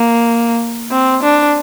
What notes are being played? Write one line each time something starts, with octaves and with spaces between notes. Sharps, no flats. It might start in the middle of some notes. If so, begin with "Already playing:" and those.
Already playing: A#3
C4
D4